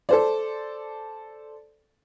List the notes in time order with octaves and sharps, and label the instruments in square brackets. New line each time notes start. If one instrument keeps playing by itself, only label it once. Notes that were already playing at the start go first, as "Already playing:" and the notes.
[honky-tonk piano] A4 C5 D5